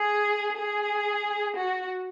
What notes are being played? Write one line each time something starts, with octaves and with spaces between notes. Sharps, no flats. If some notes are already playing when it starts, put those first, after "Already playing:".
Already playing: G#4
G#4
F#4